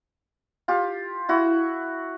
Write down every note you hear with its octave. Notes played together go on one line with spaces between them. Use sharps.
F4 G4
E4 F#4